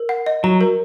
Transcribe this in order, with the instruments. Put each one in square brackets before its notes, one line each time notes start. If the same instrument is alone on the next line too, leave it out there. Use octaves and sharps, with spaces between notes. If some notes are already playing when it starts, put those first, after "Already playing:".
Already playing: [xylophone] A#4
F#5
D#5
[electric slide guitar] F#3 [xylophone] A#5
[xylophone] A#4